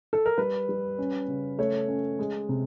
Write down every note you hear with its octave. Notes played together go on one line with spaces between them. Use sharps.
A4
A#4
G3 B4
G3
C#4
C#3
A3 C#5
C#4
G#3
C3